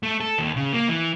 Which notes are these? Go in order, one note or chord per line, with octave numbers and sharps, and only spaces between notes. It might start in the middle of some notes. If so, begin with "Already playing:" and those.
A3
A4
D#2
C#3
A#3
E3